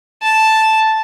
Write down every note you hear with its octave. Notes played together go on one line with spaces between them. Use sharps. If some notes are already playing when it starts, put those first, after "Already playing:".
A5